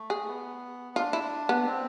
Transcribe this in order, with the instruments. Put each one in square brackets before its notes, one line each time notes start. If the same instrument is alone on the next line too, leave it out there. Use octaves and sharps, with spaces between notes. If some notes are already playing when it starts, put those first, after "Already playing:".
Already playing: [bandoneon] A3
[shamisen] G#4
[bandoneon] B3
[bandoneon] D4 [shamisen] F4
[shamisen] E4
B3
[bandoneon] C4